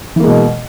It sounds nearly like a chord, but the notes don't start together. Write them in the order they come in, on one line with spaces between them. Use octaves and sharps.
E3 A#3 G#3 B2